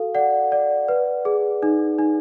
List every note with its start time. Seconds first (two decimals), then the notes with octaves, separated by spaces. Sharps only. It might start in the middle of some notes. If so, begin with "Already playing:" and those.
Already playing: F#4 A4 F5
0.15 D5 F#5
0.52 D5
0.88 B4
1.25 G#4
1.63 D#4
1.99 D#4